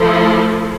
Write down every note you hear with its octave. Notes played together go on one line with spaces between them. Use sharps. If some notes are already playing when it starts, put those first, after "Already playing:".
Already playing: F3 A3 E4 A4